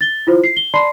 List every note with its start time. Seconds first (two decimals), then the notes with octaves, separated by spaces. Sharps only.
0.01 A6 G7
0.27 E4 F4 C5
0.44 C7
0.57 G7
0.74 D5 A5 B5 C6 C7